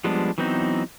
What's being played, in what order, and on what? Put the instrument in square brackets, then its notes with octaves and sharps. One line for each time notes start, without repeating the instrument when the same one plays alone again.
[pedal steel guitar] F3 G3 G#3 B3 D4
E3 F#3 B3 C4 D#4